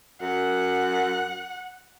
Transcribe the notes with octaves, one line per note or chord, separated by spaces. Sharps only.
F#2 F#5